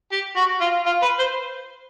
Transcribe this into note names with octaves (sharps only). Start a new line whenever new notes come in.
G4
F#4
F4
F4
B4
C5